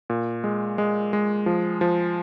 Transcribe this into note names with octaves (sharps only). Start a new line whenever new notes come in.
A#2
G#3
G#3
G#3
F3
F3